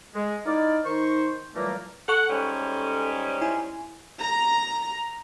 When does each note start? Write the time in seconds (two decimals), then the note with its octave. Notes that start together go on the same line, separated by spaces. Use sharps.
0.15 G#3
0.45 D#4 E4 D5 F5
0.84 D#3 D#4 C5 C#6
1.54 A#2 E3 F#3 G3 A3 A#3
2.08 A4 F#5 C#6
2.29 G#2 G3 C#4
3.41 E4 G#5
4.20 A#5